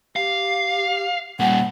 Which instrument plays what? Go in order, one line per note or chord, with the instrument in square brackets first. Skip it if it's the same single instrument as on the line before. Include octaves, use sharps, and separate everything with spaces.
[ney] G4 [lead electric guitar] F5
[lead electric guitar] A#2 G3 [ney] F#5